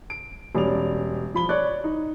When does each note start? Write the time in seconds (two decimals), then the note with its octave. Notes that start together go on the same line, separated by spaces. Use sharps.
0.10 D7
0.55 E1 G3 C#4 D5 F7
1.34 F3 B5 G7
1.49 C#5 D5 C#6 F#6
1.84 D#4